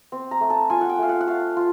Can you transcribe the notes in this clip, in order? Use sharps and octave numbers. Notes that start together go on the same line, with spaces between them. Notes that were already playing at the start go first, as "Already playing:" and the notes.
C4
A#5
A3
A5
F4 G#5
F#5
G5
A3 F5
F#5
F#5
A3 F5
F4